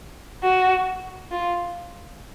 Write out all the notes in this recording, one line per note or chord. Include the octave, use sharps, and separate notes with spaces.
F#4
F4